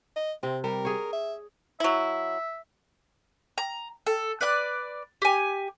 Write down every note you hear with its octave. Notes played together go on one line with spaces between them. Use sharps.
D#5
C3 C4
G3 A#4
G#4 C#5
E5
F#3 E4 E5
A#5
A4
B4 D5 F#6
G4 G#5